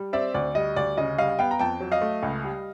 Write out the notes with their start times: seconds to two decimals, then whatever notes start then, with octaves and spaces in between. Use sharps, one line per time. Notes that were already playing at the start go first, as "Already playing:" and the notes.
Already playing: G3
0.13 C4 D5 E5
0.34 D2 D5
0.55 G3 D#5
0.76 D2 D5
0.97 C#3 D#5
1.18 G3 D#5 F5
1.39 B3 F5 G5
1.51 A#5
1.59 F2 G5 A5
1.81 F#3
1.92 D#5 F5
2.01 A3
2.23 C#2
2.44 G3